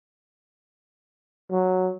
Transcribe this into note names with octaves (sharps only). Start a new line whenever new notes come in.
F#3